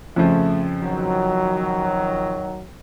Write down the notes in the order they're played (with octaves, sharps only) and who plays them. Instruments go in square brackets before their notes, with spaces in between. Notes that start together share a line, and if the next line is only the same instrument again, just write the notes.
[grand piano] F2 C#3 F3 [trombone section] A3
[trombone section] D#3 F#3